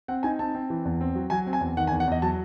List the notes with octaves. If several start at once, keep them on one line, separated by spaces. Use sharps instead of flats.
C4 F#5
D#4 G#5
C4 A5
C4
E3
E2
C4
F#3
F#3 G#5
C4
G#5
E2
D#3 F#5
G#5
E2
F#5
E2 D#5
F#3 A5